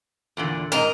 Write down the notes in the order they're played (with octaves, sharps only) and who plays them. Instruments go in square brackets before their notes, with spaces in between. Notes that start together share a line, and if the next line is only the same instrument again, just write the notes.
[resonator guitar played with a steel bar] E2 A#2 D3
[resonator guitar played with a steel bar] G#2 D#5 [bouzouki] A#4